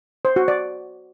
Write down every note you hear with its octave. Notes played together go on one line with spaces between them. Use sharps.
C5
F#4
D5